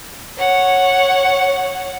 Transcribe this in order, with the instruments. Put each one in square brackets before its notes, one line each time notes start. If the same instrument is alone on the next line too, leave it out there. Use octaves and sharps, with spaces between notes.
[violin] C#5 F#5